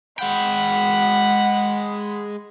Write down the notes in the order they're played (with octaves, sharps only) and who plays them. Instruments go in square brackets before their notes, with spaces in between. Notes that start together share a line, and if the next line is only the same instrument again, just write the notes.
[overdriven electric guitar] G#3 G5 [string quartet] F#5 B5